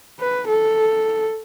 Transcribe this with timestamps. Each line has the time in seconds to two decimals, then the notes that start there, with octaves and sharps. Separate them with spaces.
0.20 B4
0.48 A4